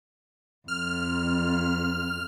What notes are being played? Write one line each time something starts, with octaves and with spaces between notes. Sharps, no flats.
F2 F6